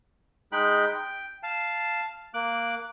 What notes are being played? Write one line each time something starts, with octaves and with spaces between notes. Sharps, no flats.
G#3 D#4 G5 B5 F#6
G5
F5 A5
A#3 D6 F#6